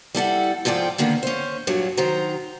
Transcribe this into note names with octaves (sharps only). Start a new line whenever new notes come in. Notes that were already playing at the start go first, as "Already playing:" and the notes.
G3 E4 A4 F#5
G#2 F3 A4 D5 G5
D3 D#3 A#3 B3
C#4 C5
G2 A#2 F#3
D#3 F#3 C5 A#5